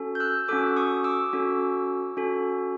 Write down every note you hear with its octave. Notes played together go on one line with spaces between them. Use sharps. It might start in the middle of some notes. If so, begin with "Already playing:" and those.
Already playing: C#4 F#4 A4
G6
E6 F#6
C#4 F#4 A4 D6 E6
C#6 D#6
D6 E6
C#4 F#4 A4
C#4 F#4 A4